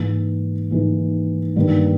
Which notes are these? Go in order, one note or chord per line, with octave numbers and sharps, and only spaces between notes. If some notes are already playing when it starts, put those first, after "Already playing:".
Already playing: G#2 E3 A#3
G#2 E3 A#3
G2 D#3 G3 A#3